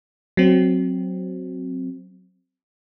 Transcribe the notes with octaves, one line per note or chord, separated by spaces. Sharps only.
F#3 C4